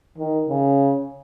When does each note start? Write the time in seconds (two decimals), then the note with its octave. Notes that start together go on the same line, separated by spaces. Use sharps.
0.18 D#3
0.48 C#3